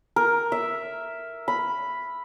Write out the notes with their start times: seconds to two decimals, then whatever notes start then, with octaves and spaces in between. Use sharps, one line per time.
0.16 A#4
0.52 E5
1.48 B5